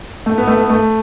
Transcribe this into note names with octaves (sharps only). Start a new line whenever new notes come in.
A3
B3
A3
B3
A3